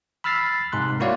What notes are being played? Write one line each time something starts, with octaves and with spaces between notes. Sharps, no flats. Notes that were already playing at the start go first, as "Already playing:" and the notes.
B5 E6 F6 A6 B6 C7
G#2 C3 C6 F#6
A#3 E4 F#4 C#5 D5 F5